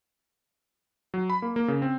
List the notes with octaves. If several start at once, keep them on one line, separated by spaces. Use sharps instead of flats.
F#3
B5
A#3
A#3
C#3
C4